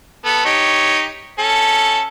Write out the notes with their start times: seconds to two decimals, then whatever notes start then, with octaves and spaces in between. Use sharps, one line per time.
0.25 B3 A4
0.45 D#4 G4 C#5
1.38 C#4 A4